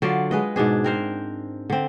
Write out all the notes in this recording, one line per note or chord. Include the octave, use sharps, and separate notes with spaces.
D3 F#3 F4 D5
G#3 B4 D#5
G#2 B2 D4 G#4
C4 A#4 C5
D3 C4